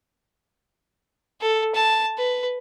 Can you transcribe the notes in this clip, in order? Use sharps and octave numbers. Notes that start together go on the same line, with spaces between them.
A4
A5
B4